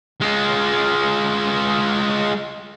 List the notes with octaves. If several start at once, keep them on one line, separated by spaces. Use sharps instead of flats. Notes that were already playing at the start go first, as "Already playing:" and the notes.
G#3 F4